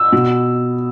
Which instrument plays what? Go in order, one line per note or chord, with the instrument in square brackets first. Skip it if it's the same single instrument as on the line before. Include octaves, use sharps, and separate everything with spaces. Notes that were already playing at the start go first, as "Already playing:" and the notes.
Already playing: [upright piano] E6
B2